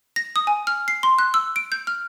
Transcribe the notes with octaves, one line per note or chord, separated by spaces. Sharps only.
A#6
D#6
G#5
F6
C7
C6
F#6
E6
D7
G6
F6